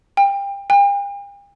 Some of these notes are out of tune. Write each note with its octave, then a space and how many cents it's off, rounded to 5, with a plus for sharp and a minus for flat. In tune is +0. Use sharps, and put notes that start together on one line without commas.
G5 +25
G5 +45